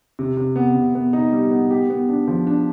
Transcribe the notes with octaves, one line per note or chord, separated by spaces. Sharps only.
C3
C3
B3
C3
B3
D#4
G3
B3
G4
B3
D4
F3
D4